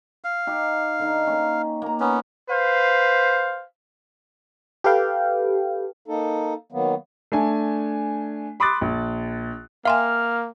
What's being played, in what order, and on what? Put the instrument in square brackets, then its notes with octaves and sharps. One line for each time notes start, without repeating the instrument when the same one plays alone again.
[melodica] F5
[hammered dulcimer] D#4 G4
D3 D#4
A#3 C#4
A#3 A#5
[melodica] B3 C#4
[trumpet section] B4 C5 F5
[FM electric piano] G4 A4 B4 F5 G5
[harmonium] A#3 D#4 A4
D#3 F#3 A#3 B3
[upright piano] A3 D4 G#5
B5 C6 D6 D#6 F#6 A6
A#1
[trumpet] A#3 [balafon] E5 G5 G#5 [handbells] F5 C6 [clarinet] F6